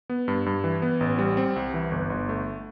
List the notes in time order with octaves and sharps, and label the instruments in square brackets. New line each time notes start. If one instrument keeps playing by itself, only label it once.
[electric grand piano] B3
G2
G2
E3
B3
A1
G3
C4
C2
E3
G1
G1
A3